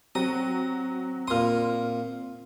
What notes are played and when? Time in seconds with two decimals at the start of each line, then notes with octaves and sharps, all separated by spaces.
0.15 F#3 C4 D#6
1.28 A#2 C6 D#6 F6